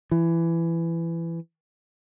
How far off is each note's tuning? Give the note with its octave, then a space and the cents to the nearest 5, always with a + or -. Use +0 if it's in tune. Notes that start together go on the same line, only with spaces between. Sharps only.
E3 +20